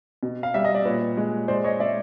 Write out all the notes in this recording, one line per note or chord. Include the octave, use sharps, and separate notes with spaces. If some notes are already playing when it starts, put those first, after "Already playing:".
B2
F5
G3 E5
D#5
D5
A#2 B4 C#5
G#3
G#3 C5 D5
C#5 D#5
G#3 D5 E5